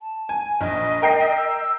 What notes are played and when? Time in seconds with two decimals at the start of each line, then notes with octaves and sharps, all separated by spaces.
0.01 A5
0.29 G#5
0.61 A#1 D#5
1.02 A#4 G5 C7
1.37 E6